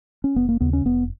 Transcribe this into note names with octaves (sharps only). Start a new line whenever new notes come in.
C#4
F1 B3
A#3
D#2 C#3 B3
C#4
F1 B3